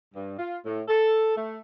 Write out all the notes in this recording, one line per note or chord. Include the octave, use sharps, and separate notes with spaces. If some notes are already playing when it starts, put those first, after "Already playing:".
G2
F4
A2
A4
A3